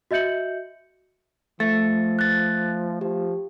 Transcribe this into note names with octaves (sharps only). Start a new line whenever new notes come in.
F#4 D#5 E5 G6 C#7 F#7
F3 A3 A6
F#6 A6
F3 G4